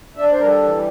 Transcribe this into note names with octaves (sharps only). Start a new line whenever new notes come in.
D4 E5
D5
C5
G3 A#4
A4
E3